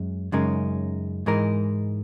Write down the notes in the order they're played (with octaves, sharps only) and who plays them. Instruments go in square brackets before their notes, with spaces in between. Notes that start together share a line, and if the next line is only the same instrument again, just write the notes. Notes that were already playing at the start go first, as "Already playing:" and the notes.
Already playing: [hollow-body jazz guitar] F#2 G#3
F#2 C#3 G#3 D#4 A#4
G#2 E3 G#3 D#4 A#4